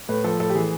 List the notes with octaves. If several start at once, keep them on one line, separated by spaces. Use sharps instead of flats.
A2 B4
F3 A4
A2 A4
G4
E3 G#4